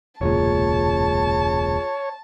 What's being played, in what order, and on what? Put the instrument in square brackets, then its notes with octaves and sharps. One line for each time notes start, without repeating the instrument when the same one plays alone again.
[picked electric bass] E1 C#2 A#2 [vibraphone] F4 G#4 [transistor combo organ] C#5 [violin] A5